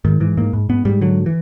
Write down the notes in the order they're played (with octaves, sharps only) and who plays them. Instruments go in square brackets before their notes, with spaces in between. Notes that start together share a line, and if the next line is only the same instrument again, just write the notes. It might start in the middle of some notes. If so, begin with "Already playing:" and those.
[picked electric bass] G#2 D#3
G#2 E3
G#2 A#3
G#2
G#2 B3
G#2 G3
D3 F#3
E3